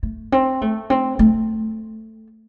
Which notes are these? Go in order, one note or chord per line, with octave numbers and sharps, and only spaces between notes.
A3
C4
A3
C4
A3